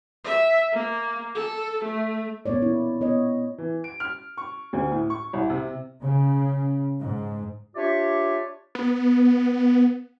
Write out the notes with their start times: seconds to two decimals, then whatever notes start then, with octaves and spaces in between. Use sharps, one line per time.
0.24 E5
0.73 A#3
1.35 A4
1.85 A3
2.46 A#2 A#3 B3 C#5 D5
2.62 E4
3.01 B3 C#5 D#5
3.58 E3
3.84 D7
4.00 F6
4.37 C#6
4.73 D2
4.92 A2
5.10 C#6
5.33 C2
5.50 C3
6.03 C#3
7.02 G#2
7.76 D4 F4 G4 C#5 D5 E5
8.75 B3